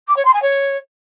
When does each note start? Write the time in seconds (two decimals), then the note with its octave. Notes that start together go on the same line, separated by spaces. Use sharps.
0.07 D6
0.16 C#5
0.25 C6
0.33 G#5
0.42 C#5